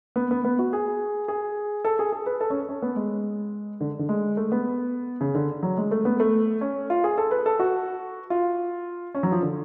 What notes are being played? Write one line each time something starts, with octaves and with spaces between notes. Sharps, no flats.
B3
B3
B3
F#4
G#4
G#4
A4
G#4
G#4
B4
A4
C#4
C#4
B3
G#3
D3
D3
G#3
A3
B3
C#3
D3
F#3
G#3
A3
B3
A3
C#4
F4
G#4
A4
B4
A4
F#4
F4
C#4
F#3
F3
D3